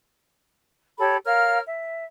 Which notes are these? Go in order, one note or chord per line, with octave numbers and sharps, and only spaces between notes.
G4 A4 C#5 B5
A#4 C#5 F5 F6
E5